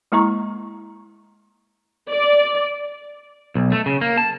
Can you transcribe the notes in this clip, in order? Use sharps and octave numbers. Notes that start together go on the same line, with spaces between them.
G#3 A#3 E4 A#5 C#6
D5
B1
A3
C#3
A#3
A5